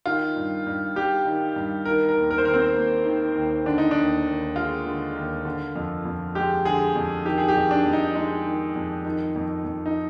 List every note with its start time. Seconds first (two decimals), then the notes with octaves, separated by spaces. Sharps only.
0.06 D#3 F4
0.36 G2
0.66 G2
0.96 G3 G4
1.25 D#3
1.56 G2
1.85 D#3 A#4
2.09 A#4
2.15 D#2
2.31 A#4
2.38 C5
2.45 D#2 A#4
2.54 C4
2.75 A#3
3.05 D#3
3.35 D#2
3.66 D3 D4
3.78 D#4
3.91 D#2 D4
4.26 D#2
4.56 G#3 F4
4.86 D3
5.16 D#2
5.45 D3
5.76 F2
6.05 F2
6.35 G#3 G4
6.65 D3 G#4
6.95 F2
7.25 D#3 G4
7.38 G#4
7.48 G4
7.55 F2
7.71 D4
7.86 F2
7.93 D#4
8.15 G#3 D#4
8.46 D#3
8.76 F2
9.05 D#3
9.36 F2
9.65 F2
9.86 D#4